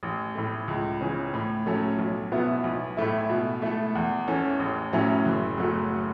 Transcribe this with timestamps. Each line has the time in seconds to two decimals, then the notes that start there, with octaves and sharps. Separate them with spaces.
0.03 A1
0.35 A2 A3
0.68 C#2
1.01 C#3 E3 C#4
1.34 A2
1.66 F#3 A3 C#4 A4
1.98 B1
2.32 B2 B3 E4
2.64 B1
2.97 A2 A3 E4
3.30 B2
3.62 A3 E4 A4
3.95 E2
4.28 E3 C#4 A4
4.59 A1
4.93 A2 F#3 C#4 E4
5.25 F#1
5.58 F#2 F#3 A3 F#4